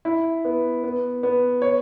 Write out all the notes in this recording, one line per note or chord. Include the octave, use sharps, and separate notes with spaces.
E4
B3
B3
B3
C#5